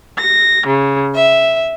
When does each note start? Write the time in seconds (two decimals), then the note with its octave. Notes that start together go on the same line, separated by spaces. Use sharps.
0.18 A#6
0.66 C#3
1.15 E5